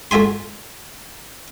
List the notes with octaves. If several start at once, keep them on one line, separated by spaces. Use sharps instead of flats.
A3 F4 E5 G#5 C6